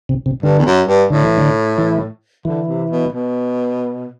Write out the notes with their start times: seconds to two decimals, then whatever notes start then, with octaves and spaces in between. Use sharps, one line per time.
0.09 C3
0.26 C3
0.43 G2 D3
0.58 E2
0.66 F#2
0.88 G2
1.10 A2 D3
1.24 E3
1.38 D3
1.78 E3
2.45 D3 E3
2.68 C3
2.91 B2
3.13 B2